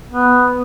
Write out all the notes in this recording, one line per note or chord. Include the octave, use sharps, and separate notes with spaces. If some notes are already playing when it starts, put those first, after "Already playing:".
B3